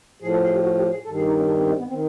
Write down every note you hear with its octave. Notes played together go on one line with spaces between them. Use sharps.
A2 F3 G#4
A4
G#4
G4
F#4
G4
G#4
G2 D#3 A4
G#4
D#4
C#4
D4
C4
C4
B3
C4
D#3